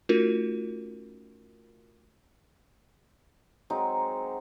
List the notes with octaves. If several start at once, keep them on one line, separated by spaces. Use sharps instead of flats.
A3 C#4 D#4 F4 F#4 A#4
F#3 G#3 C4 D#4